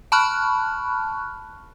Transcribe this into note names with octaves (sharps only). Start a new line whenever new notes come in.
A5 B5 C#6 F6 F#6